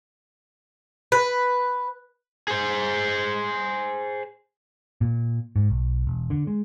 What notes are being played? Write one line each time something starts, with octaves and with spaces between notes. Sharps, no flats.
B4
G#4 C5
A#2
G#2
B1
E1
D3
G#3